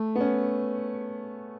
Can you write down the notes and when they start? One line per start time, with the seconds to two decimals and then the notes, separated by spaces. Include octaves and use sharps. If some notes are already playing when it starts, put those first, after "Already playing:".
Already playing: A3
0.15 B3
0.21 C#4